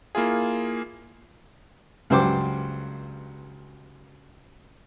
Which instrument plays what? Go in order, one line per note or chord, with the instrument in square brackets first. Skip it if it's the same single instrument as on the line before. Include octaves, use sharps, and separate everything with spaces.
[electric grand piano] A#3 E4 F4 G#4
[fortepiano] C#2 G2 F#3 C5 G5 D6